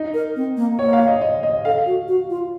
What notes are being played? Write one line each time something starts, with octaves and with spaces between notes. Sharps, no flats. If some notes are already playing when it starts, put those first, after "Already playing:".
Already playing: D#4
A#4
C4
A#3
A#3 C#5
F5
D#5
D#5
D#5
A4 F5
F#4
F#4
F4